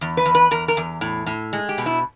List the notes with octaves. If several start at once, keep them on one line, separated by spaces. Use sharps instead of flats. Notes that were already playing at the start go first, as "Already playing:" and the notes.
E2
B4
E2
B4
E2 A#4
A#4
E2
A2
A2
G#3
G4
B2
E4